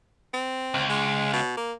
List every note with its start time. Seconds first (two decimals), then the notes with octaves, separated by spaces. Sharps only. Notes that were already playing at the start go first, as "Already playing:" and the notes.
0.34 C4
0.74 C#2
0.90 G#3
1.33 B2
1.57 A#3